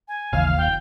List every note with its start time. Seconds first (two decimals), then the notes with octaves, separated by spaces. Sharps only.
0.08 G#5
0.33 G#1 D#2 C#3 E3 F5 F6
0.57 F1 G5